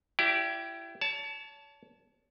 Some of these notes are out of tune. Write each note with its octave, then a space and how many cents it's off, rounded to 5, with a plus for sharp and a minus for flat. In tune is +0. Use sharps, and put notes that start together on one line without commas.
E4 +25 G4 -15 D5 +0
C#5 +30 A5 -5